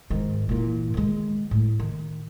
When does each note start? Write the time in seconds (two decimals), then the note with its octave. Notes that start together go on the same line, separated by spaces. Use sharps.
0.10 G#2 D#3
0.49 A#2 E3
0.94 D#3 G#3
1.51 A2
1.80 D#3